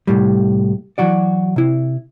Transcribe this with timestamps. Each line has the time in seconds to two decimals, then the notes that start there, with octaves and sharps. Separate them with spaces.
0.07 C2 F#2 A2 G3
0.98 E3 F#3 F#4 D5
1.56 C3 E4